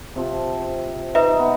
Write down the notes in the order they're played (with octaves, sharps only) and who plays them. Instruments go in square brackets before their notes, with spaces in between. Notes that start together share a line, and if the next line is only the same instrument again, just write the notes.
[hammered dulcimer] C3 F3
[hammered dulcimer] D#4 [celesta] B4 E5
[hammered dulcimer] B3